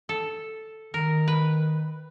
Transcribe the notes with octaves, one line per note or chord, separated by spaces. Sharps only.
A4
D#3 A#4
B4